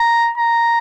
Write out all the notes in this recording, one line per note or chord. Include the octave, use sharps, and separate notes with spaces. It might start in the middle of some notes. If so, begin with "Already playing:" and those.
Already playing: A#5
A#5